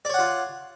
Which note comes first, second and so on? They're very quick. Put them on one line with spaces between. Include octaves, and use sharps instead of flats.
D5 C#5 F#5 F4